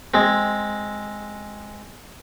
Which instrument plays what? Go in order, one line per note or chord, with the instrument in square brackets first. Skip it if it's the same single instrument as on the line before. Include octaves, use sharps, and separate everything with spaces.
[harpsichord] G#3 C4